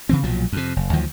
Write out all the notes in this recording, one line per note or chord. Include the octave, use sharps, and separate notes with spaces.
C#3 E3 C4
B1 A#2 F3 F#3
F2 C3
F#1
D2 D#3 F3 F#3